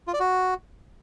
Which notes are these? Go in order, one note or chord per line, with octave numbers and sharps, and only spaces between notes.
F4
D5
F#4